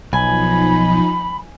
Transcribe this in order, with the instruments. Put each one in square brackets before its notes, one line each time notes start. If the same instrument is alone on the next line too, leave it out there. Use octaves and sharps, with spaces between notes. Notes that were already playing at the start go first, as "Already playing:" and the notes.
[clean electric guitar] B1 [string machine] F3 D#4 [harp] G#5 [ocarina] B5